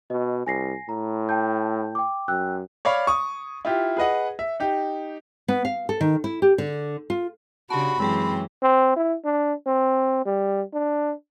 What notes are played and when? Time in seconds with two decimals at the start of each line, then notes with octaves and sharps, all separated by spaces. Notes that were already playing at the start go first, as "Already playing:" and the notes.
0.10 B2 D#5
0.47 C2 G#5 A#6 C7
0.89 A2 A#5
1.29 G5 A5 G6
1.95 G5 D6
2.28 F#2 G5 E6 F#6
2.85 C#5 D5 F5 B5 C#6
3.07 C#6 D#6
3.65 E4 F4 G4
3.97 G#4 B4 D#5 F#5
4.39 E5
4.60 D#4 G4
5.48 B3
5.65 F5
5.89 A4
6.01 D#3
6.24 E4
6.42 G4
6.58 D3
7.10 F4
7.70 C#3 D4 F#4 G4 A5 B5
8.00 F#2 E3 G#3 C4 G#4 G5
8.63 C4
8.96 E4
9.25 D4
9.66 C4
10.25 G3
10.73 D4